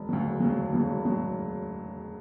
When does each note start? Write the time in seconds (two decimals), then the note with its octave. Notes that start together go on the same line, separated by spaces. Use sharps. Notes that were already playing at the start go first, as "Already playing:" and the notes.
Already playing: E1
0.09 D2 C#3 F#3
0.25 E1
0.40 D2 C#3 F#3
0.56 E1
0.72 D2 C#3 F#3
0.88 E1
1.04 D2 C#3 F#3